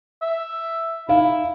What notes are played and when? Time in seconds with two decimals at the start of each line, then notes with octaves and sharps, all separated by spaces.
0.22 E5
1.09 D#4 E4 F5